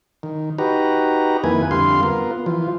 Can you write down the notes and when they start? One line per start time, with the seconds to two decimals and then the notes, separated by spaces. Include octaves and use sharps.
0.23 D#3
0.58 D#4 F#4 G4 B4 A#5
1.44 F2 D#3 A#3 E4 B4 G#5
1.71 F2 D3 G3 F5 C6
2.03 B3 F4 A#4
2.46 E3 F3 F4